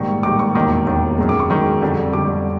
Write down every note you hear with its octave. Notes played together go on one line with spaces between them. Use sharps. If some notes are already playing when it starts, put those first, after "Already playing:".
Already playing: A#1 G#2 D#3 G3 C#6
A#1 G#2 D#3 G3 D6
C#6
E1 D#2 D#3 D6
E1 D#2 D#3
F#2 D#3 G#3
D6
C#6
F#2 D#3 G#3 C#6
F2 D3 G3
F2 D3 G3 D6